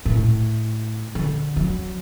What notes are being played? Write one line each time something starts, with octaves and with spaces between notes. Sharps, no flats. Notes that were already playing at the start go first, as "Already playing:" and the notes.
A2
D3
F#3